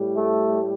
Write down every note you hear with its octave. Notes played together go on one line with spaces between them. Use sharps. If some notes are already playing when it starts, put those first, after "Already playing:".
Already playing: A2 G3
A3